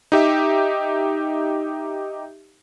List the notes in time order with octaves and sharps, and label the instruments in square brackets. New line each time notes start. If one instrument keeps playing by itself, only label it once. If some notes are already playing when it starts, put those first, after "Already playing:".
[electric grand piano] D#4 G4 E5